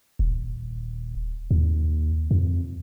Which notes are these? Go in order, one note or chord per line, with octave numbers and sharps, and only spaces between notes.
D#1
D#2
F2